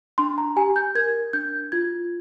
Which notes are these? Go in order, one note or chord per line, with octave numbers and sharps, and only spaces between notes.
D4 C6
A#5
G4 G#5
G6
A#4 G#6
D4 G6
F4 G#6